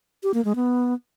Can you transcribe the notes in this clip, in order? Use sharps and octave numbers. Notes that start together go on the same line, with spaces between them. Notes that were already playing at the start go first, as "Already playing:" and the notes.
G4
A#3
G#3
B3